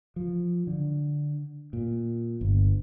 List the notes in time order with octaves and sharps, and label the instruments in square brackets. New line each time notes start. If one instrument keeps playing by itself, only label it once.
[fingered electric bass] F3
D3
A#2
G1